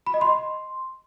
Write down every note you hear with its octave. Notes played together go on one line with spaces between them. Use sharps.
B5
D#5
C6